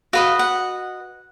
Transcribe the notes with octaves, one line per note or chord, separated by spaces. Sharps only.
F#4 B4 D#5 F5
F#5